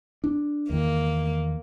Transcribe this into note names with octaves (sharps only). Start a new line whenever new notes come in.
D4
E2 D#3 A#3